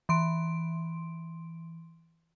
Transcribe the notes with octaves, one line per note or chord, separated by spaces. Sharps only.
E3 C6 D7